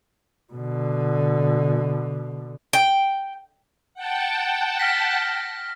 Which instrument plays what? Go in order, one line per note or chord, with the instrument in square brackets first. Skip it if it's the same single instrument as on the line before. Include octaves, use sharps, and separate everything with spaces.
[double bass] B2 D3
[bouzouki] G5
[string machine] F#5 G5 A5
[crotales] F6 A#6 B6